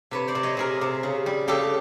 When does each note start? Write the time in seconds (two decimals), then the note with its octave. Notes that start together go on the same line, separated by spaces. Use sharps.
0.11 C3 B4 C#5
0.28 C5 D5
0.35 C3
0.43 C#5 D#5
0.57 C3 G#4 A#4
0.81 C3
1.03 C#3
1.26 G3
1.48 C#3 G4 A4